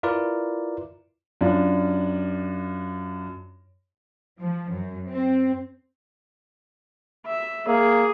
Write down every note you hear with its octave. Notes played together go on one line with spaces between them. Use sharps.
E4 F4 A#4 B4 D5
F#2 D4 F4
F3
F#2
C4
E5
A#3 G#4